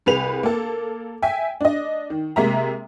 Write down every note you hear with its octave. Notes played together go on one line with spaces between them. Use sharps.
C2 G#4 B4 F7
A#3 A4
E5 G5 G#5
D4 D#5
D#3
C3 G#3 A#3 E5 A#5